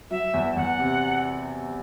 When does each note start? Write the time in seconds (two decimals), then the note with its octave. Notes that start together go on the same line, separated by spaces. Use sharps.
0.11 F#3 E5
0.34 E2
0.56 E2 F#5
0.79 C3